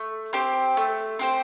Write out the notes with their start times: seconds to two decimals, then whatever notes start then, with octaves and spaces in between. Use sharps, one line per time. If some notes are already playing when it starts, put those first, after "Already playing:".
Already playing: A3
0.33 C4 G4 C5
0.77 A3
1.19 C4 G4 C5